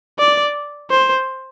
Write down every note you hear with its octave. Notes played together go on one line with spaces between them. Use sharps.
D5
C5